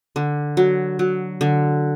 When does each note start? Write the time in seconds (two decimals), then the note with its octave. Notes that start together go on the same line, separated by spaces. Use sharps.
0.16 D3
0.57 F#3
0.99 F#3
1.41 D3